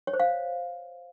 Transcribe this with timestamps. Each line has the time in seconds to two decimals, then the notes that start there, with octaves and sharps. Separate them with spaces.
0.07 C#5
0.13 C5
0.20 F5